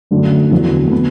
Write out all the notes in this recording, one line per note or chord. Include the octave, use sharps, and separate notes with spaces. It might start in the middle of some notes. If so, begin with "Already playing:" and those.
F#2 D3 F#3 A3
E2 D3 F#3
A3
B3